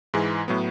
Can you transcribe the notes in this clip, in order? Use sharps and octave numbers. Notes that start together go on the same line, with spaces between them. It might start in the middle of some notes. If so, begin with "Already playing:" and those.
G#2 E3 G#3
A2 F#3 B3